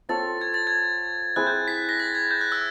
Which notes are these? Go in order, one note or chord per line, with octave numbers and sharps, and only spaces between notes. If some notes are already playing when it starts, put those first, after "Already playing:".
C4 F4 A4 C#5 A6
G#6
A6
G#6
C4 E4 G#4 F#6
G6
B6
A#6
A6
G#6
G6
F#6
E6